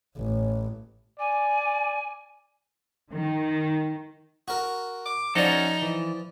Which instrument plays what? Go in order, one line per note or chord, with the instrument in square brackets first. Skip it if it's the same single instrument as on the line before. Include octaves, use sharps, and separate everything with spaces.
[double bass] A1
[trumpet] D5 [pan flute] G#5
[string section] D#3
[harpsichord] F#4 A#4
[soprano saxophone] D6
[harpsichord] F3 D5 [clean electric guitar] C#4 F#4 A4 [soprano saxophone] D#4
[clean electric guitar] E3